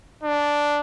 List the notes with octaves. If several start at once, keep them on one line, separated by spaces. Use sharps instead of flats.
D4